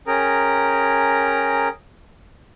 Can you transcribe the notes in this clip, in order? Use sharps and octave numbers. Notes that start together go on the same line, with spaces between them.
C#4 G#4 A#4 G5 A#5